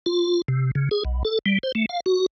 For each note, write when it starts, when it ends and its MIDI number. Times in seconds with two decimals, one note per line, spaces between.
0.06 0.42 65
0.48 0.71 48
0.75 0.89 49
0.91 1.03 68
1.05 1.23 35
1.25 1.39 69
1.46 1.58 55
1.63 1.72 72
1.75 1.86 57
1.89 2.00 77
2.06 2.26 66